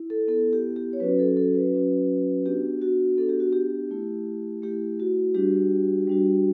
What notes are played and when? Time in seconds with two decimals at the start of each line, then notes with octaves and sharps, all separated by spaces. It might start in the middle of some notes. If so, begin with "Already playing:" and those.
Already playing: E4
0.10 A4
0.28 B3 E4 A4
0.53 G4
0.76 G4
0.93 C#5
1.00 F#3 C#4 F#4 B4
1.19 A4
1.37 A4
1.55 B4
1.73 F#3 C#4 F#4
2.46 B3 D4 F#4 G4
2.82 F#4
3.17 B3 D4 F#4 A4
3.29 G4
3.40 F#4
3.53 G4
3.91 A3 E4
4.62 A3 E4 G4
5.00 F#4
5.35 G3 D4 F#4 G4
6.07 G3 D4 F#4